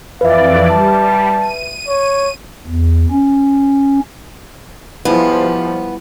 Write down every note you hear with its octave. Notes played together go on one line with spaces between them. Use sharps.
F2 E3 B4 D5 E5 F5
G3 A5
D#7
C#5
E2
C#4
F3 G3 B3 E4 G#4